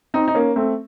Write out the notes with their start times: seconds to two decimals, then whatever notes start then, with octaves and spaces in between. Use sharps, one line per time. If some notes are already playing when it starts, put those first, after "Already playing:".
0.14 C4 D#4
0.28 D#4
0.35 A#3 C#4
0.56 A3 C4